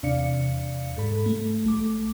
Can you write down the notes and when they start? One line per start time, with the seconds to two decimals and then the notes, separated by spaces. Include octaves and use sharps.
0.03 E2 C3 D4 D5 F5 C#7
0.97 G#2 A4 B5
1.26 A3
1.64 A#1 A3 D6